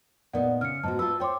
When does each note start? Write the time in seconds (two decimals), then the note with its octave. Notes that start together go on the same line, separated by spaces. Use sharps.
0.33 A#2 B3 D#4 D5 F#5
0.61 C#3 F6 C#7
0.83 G#2 B3 F#4 A5
0.99 F4 B4 A5 E6
1.20 C5 C#5 G5 C6 D6